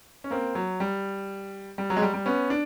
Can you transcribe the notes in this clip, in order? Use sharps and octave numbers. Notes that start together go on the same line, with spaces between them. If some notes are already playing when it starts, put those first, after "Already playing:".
C#4
A#3 C4
F#3
G3
G3
F#3
G#3
G3
G3
B3 C#4
D4